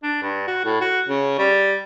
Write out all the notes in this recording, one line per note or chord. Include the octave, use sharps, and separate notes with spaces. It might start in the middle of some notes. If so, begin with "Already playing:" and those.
D4
G2
F#4
A2
F#4
C#3
G3